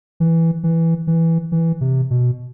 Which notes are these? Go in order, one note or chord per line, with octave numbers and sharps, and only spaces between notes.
E3
E3
E3
E3
C3
B2